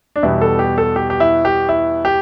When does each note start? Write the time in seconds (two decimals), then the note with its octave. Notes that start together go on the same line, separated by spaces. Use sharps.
0.16 D4
0.23 E2 B2 G3 E4
0.41 A4
0.59 G4
0.78 A4
0.96 G4
1.10 G4
1.20 E4
1.45 G4
1.69 E4
2.05 G4